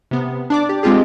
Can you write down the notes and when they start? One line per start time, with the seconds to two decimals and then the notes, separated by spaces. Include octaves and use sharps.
0.11 C3 B3
0.50 D4 D5 D6
0.69 G4
0.83 G#3 C4 F4 G4 G#4